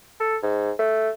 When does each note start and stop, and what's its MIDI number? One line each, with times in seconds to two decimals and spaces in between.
0.20 0.37 69
0.42 0.71 44
0.79 1.10 57